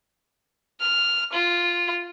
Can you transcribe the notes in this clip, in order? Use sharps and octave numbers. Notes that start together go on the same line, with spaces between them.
F6
F4